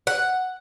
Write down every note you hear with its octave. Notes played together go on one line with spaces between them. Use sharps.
F#5